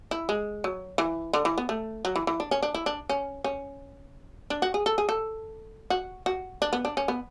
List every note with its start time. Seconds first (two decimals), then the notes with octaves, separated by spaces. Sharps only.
0.11 E4
0.29 G#3
0.64 F#3
0.98 E3
1.33 D3
1.45 E3
1.58 B3
1.69 A3
2.05 F#3
2.16 E3
2.27 E3
2.40 D4
2.51 C#4
2.63 D4
2.75 E4
2.86 D4
3.10 C#4
3.44 C#4
4.50 D4
4.62 F#4
4.74 G#4
4.86 A4
4.98 G#4
5.09 A4
5.90 F#4
6.26 F#4
6.62 D4
6.73 B3
6.85 D4
6.97 C#4
7.08 B3